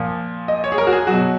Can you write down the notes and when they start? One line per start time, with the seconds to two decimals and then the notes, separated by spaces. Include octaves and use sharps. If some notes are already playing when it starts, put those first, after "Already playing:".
Already playing: A#2 F3
0.48 D#5
0.64 C#5
0.72 G#4
0.78 A#4
0.87 F#4
0.93 G#4
1.07 B2 F#3 F#4